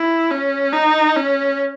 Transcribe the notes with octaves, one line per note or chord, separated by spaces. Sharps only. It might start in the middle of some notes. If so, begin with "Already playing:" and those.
Already playing: E4
C#4
D#4
C#4